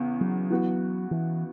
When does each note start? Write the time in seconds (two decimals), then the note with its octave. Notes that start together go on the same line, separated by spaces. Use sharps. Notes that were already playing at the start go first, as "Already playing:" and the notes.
Already playing: E2 C#3
0.21 F#3
0.50 E3 B3 F#4
1.11 E3